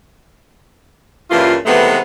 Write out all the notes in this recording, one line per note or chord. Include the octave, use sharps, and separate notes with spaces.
G2 C#3 E3 A#3 F4
C3 D#3 E3 G#3 A3 B3